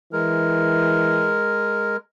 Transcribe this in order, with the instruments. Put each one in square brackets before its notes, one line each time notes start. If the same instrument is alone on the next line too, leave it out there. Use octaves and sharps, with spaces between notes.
[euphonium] E3 [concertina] G#3 A#4